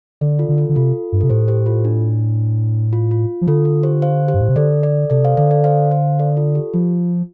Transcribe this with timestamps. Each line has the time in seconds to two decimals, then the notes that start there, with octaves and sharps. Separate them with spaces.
0.21 D3 A4 D5
0.39 F4 A4
0.49 D3
0.58 F4 A4
0.69 D3
0.75 C3 F4 A4
1.12 G2
1.21 C3 A4
1.30 A2 G4 C5
1.48 G4 C5
1.66 F4 A4
1.85 D4
2.93 F4
3.11 F4
3.41 F3
3.47 D3 F4 A4
3.65 F4
3.83 G4 C5
4.02 C5 F5
4.28 G4 C5
4.34 G2
4.41 A2
4.49 C3
4.56 D3 A4 D5
4.83 A4 D5
5.10 C3 A4 D5
5.24 C5 F5
5.37 D3 A4 D5
5.51 A4 D5
5.64 C5 F5
5.91 C5 F5
6.19 A4 D5
6.37 F4 A4
6.55 G4
6.73 F3 F4